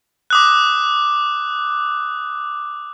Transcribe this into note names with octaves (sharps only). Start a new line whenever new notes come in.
D6 D#6 F#6